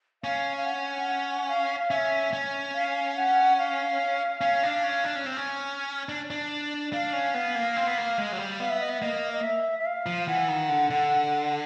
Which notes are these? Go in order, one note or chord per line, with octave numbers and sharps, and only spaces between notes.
C#4 F5
F5
F#5
F#5
F5
F5
C#4 E5
C#4
F5
F#5
F5
C#4
D4
C#4
D4
C#4
C4
C#4
D4
D4
D4 F5
C#4
B3
A#3
C4
B3
A#3
G#3
F#3
G3
B3 F5
E5
D#5
E5
A#3 D#5
D#5
E5
E5
F5
F3
E3 F#5
D#3
D3
D3